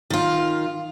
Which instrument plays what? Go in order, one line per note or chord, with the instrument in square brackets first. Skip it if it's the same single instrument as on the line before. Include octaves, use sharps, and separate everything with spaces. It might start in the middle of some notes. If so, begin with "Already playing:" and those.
[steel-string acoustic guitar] D#3 F4